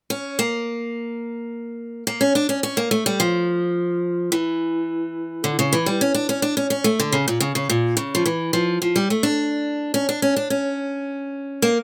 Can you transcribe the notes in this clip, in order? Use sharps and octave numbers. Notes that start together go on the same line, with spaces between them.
C#4
A#3
A#3
C#4
D4
C#4
C#4
A#3
A3
G3
F3
E3
D3
C#3
E3
G3
C#4
D4
C#4
D4
C#4
C#4
A3
D3
C#3
A#2
C#3
C#3
A#2
C#3
F3
E3
F3
F3
G3
A3
D4
C#4
D4
C#4
D4
C#4
A#3